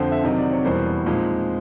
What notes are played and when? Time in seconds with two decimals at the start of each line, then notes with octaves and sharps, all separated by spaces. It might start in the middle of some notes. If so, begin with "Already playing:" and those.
Already playing: F2 D3 F3 C5
0.12 E5
0.24 C3 D#3 F#3 D#5
0.38 D5
0.52 C#5
0.65 E2 B2 G3 A#3 C5
1.06 A#2 F3 G#3 C4 D#4